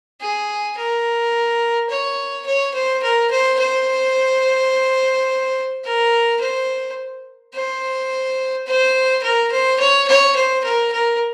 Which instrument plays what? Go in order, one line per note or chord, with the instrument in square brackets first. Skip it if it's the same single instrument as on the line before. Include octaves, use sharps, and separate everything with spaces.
[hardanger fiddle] G#4
A#4
C#5
C#5
C5
A#4
C5
C5
A#4
C5
C5
C5
A#4
C5
C#5
C#5
C5
A#4
A#4